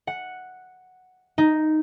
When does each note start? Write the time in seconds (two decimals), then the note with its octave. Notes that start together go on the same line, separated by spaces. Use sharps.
0.07 F#5
1.38 D#4